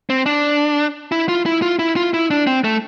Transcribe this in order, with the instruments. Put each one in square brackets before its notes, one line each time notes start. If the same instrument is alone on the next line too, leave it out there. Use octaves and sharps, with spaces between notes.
[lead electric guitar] C4
D4
E4
F4
E4
F4
E4
F4
E4
D4
C4
A3